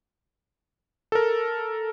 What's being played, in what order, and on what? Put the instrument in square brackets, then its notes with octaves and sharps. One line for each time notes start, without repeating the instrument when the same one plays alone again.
[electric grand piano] A4 A#4